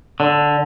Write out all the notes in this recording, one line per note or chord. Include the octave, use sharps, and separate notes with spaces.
D3